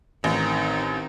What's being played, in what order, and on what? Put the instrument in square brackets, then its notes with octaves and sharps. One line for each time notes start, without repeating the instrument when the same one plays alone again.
[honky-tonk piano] A1 [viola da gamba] D#3 C4 D#4